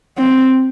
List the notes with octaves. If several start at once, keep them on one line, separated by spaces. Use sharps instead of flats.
C4